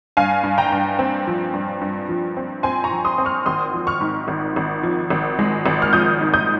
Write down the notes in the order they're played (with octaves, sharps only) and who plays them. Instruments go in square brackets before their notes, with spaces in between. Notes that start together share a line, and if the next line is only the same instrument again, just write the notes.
[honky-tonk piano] G2 F5 G#5
G2
G5 A#5
G2
C4
F3
G2
G2
F3
C4
C4 G#5 C6
A#5 C#6
F3
C6 D#6
C4
C#6 F6
G#1 C6 D#6
F3
C#6 F6
G#2
G#1
G#1
F3
G#1
G#3
G#1
F6
F3 D#6 G6
G#2
D#6 G6